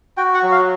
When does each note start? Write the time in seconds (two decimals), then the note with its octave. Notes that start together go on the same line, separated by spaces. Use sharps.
0.17 F#4 G5
0.34 F#5
0.43 F#3
0.52 F5